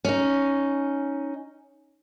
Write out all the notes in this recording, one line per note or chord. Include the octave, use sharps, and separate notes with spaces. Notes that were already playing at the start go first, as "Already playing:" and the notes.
C#4 D#4